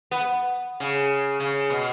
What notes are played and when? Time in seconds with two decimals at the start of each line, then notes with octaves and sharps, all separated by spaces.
0.11 B3
0.80 C#3
1.40 C#3
1.70 B2